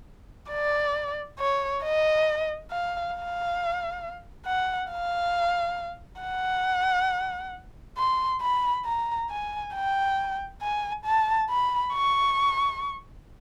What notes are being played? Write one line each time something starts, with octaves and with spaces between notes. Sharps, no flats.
D5
C#5
D#5
F5
F5
F#5
F5
F#5
C6
B5
A#5
G#5
G5
G#5
A5
B5
C#6